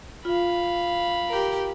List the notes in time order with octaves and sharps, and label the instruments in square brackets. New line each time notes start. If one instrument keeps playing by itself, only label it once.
[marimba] F4 [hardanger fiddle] F5 B5
[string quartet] G4 A#4